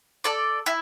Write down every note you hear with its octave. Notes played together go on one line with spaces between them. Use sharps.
A4 D5
E4